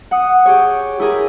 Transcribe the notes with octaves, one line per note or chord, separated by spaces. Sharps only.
F#5 D#6
G4 G#4 C#5
E4 G4 G#4 A#4